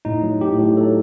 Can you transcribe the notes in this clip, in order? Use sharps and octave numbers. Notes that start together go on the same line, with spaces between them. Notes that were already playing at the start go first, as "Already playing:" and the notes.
A2 D#4
F#3
A2 G4
A2
F#3 A4